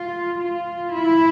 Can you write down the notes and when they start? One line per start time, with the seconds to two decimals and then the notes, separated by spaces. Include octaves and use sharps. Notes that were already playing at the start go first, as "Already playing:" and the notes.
Already playing: F4
0.39 F4
0.94 E4